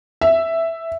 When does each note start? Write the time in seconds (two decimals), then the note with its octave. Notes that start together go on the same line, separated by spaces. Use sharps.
0.21 E5